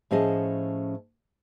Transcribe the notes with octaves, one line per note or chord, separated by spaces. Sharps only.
A2 F3 C#4 G#4 D#5 A5